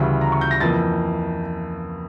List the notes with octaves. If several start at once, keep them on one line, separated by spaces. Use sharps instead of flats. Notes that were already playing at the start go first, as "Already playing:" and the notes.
Already playing: D2 C#3 E3 G3
A#5
C#6
G6
A#6
F2 E3 A#3 A6